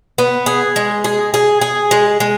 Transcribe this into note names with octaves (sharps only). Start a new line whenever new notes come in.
B3
G#4
G#3
G#4
G#4
G#4
G#3
G#3